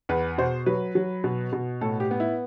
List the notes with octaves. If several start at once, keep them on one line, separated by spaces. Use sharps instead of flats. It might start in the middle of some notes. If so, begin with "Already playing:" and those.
E2 B4
B2 C5
F#3 B4
F#3
B2
B2
A2 A4
G4
B3
E4